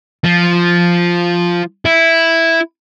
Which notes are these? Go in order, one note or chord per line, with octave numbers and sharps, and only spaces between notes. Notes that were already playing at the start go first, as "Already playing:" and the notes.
F3
E4